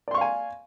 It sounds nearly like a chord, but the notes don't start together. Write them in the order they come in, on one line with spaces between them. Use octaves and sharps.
D5 C6 C#6 F5 G#5